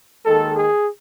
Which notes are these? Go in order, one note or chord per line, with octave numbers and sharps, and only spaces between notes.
D#2 D#3 G#3 A4
G#4